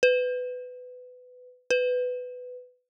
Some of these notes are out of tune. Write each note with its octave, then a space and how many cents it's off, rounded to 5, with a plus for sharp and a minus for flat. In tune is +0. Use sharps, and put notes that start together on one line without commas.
B4 +20
B4 +15